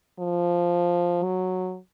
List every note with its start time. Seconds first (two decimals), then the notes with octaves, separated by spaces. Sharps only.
0.20 F3
1.23 F#3